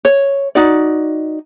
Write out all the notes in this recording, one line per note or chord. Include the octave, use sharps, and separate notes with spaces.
C#5
D#4 F#4 D5